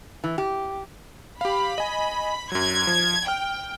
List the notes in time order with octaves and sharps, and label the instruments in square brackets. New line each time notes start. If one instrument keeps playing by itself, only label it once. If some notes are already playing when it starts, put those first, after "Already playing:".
[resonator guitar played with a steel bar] E3
G4
[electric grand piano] G4 F5 [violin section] B5
[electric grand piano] D#5 G#5
[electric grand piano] F#2 F#3 [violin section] G#6
[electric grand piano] F3
[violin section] G5 [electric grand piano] F6